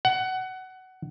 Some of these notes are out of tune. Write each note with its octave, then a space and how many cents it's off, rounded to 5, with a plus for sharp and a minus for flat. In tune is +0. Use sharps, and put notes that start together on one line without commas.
F#5 +20